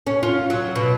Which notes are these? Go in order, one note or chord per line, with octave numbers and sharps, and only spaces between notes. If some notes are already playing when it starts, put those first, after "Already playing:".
C#4
F4
F#3
B2